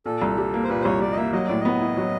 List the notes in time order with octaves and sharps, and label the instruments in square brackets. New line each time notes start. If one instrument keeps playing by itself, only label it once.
[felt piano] A#2 [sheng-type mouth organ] A4
[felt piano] C2
G3
A#3
[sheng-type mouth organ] C5
[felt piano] A#2 [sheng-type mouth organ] B4
[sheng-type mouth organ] C5
[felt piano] C2 [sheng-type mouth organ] C#5
[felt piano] G3 [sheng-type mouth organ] D5
[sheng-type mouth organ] D#5
[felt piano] A#3 [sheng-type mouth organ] E5
[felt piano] F#3 [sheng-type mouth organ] D#5
[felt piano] A2 [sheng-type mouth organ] D5
[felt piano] B3 [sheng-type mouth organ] D#5
[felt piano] E4
F#3